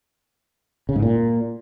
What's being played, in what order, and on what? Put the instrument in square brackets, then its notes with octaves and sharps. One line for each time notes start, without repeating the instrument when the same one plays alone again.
[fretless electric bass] C#3
G#2
A#2